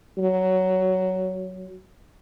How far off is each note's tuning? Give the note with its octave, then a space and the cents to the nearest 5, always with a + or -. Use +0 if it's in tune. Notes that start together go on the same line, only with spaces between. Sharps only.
F#3 +10